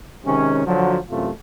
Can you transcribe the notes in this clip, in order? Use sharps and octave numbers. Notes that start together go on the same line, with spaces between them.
C3 D#3 G#3 C#4
D3 F3 F#3
A1 F#2 C3 A3 F4